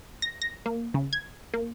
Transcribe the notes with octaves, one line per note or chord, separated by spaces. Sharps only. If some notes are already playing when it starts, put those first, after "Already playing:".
A#6
A#6
A#3
C#3
G#6
A#3